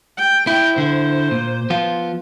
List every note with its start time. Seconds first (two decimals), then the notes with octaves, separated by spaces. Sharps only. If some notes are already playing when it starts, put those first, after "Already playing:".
0.17 G5
0.47 E4 G5
0.78 D3 E4 C5
1.31 A#2
1.70 F3 B3 F4